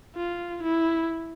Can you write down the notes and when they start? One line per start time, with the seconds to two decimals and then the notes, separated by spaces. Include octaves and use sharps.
0.16 F4
0.63 E4